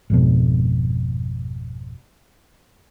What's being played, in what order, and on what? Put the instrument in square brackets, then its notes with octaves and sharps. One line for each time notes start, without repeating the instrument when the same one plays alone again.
[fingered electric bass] G#1 F2 B2